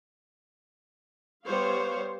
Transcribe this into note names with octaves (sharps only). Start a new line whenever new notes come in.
G3 B3 C5 C#5 F5